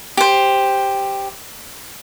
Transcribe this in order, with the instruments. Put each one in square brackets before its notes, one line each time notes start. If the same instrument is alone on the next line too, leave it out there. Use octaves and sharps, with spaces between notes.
[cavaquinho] G4 C5